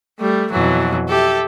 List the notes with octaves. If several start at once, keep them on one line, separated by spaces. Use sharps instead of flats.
G3 A3
F2 B2 E3 F#3
G4 A4 E5